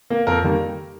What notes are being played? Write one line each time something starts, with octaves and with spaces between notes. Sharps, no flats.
A#3
F2 A#4
D#3 G3 A#3